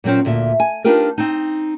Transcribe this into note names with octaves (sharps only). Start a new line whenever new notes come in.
A#2 F#3 A#3 C4 C#4
D2 A#2 E5
G#5
D4 D#4 F4 G4 A#4 B4
C4 D#4